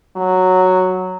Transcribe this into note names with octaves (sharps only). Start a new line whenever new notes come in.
F#3